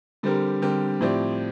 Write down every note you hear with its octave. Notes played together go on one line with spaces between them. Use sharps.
D3 G3 C4 G4 A#4
D3 G3 C4 G4 A#4
A2 F3 C4 G4 D5